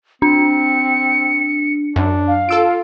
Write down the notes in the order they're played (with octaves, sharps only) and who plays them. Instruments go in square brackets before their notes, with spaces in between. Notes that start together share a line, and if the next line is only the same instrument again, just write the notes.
[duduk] C4 [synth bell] D4 [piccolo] C#7
[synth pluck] F#2 [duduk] D4
[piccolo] F5
[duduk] F4 [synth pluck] A4 E6 D7